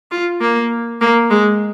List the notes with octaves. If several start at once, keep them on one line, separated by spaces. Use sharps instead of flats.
F4
A#3
A#3
G#3